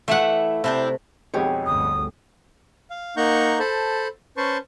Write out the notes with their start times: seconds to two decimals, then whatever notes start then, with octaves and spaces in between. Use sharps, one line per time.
0.08 E3 A3 E4 E5 F#5
0.64 C3 C4 D4 E4
1.34 B1 F2 G#3 G4 G#4 C#5
1.66 G1 D2 D#6
2.90 F5
3.17 A#3 D#4 F#5 A#5 C#6 G6
3.59 A4 C5 A5 B5
4.37 C#4 B4 C5 A5 C6 C#6